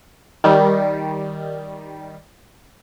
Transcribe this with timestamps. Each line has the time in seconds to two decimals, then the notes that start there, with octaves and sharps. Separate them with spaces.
0.44 D#3 G3